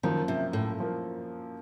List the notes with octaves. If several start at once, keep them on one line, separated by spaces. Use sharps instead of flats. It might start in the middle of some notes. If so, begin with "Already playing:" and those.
F#2 D#3 F3 A#3
C3
A2
F3 A#3